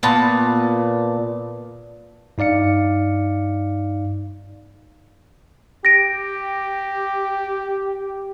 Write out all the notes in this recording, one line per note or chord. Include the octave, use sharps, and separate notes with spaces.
A#2 B3 A5
G2 D#4 D5 F5 C#7
G4 A#6 D7